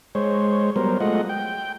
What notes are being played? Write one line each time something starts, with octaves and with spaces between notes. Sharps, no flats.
G#3 C5 C#5
F#3 G3 B3 A#4 C5
G#3 A3 F4 D#5 F#5
G5